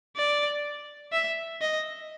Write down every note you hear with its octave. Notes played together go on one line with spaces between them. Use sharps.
D5
E5
D#5